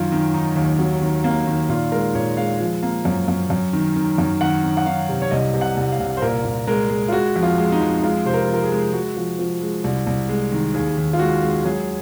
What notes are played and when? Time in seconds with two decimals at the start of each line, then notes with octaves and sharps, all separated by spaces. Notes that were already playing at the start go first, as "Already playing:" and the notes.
Already playing: F#2 D#3 F4
0.12 D#3
0.34 D#3 D#4
0.56 D#2
0.79 F#3
1.01 D#3
1.24 A#3
1.47 D#3
1.69 A#2 F4
1.92 G#3 A#4
2.15 A#2 C#5
2.37 G#3 F5
2.61 F3
2.83 A#3
3.05 F#2
3.28 F#2
3.50 F#2
3.73 D#3
3.96 D#3
4.18 F#2
4.41 D#3 F#5
4.64 D#3
4.77 F#5
4.86 D#3 F5
5.09 C3
5.22 C#5
5.31 C2 D#5
5.54 C3
5.61 F#5
5.77 C2
5.92 F5
6.00 C2
6.17 C5
6.22 A#2 A#4
6.44 A#2
6.67 G#3 A#4
6.89 G#3
7.08 F4
7.12 G#3 F#4
7.36 F2
7.43 F4
7.58 G#3
7.72 D#4
7.81 F2
7.98 D#4
8.03 G#3 F4
8.25 C3 C5
8.34 A#4
8.48 F3
8.54 A#4
8.64 G#4
8.71 G#3
8.93 G#3 F#4
9.17 F3
9.39 F3
9.61 G#3
9.84 C2
10.07 C2
10.29 G#3
10.52 D#3
10.74 D#2 G#4
10.97 D#2
11.13 F4
11.19 G#3 F#4
11.42 G#3
11.64 F#3 G#4